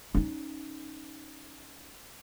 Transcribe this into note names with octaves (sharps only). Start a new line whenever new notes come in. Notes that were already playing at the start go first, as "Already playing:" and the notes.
C#4 D#4